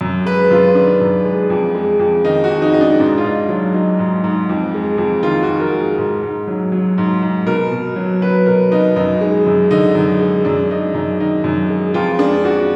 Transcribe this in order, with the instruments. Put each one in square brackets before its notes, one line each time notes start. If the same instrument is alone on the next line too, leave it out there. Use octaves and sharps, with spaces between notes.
[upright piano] F#2
G#3 B4
F#2 F4
D#3 D4
F#2
G#3
F2
G#3
F2
D#3 D#4
F#4
F2
D#4
G#3 D#4
D4
G#2 D4
F4
G#2 D#4
F#3 F4
F#3 D#4
G#2
G#2
F2
G#3
F2
D#3 F4
F#4
F2
A#4
G#3
G#2
G#2
F#3
F#3
G#2
G#2
B2 A#4
B2
F#3
F#3 B4
B2 A#4
B2 D#4
F#2 D#4
G#3
F#2
D3 D#4
F#2
G#3
F#2 D4
G#3 D#4
F#2 D#4
D#3 D#4
F#2
G#3
F2 F4
G#3 D4
F2 F#4